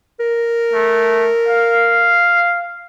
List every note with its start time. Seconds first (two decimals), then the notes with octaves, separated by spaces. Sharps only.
0.20 A#4
0.73 A3
1.48 F5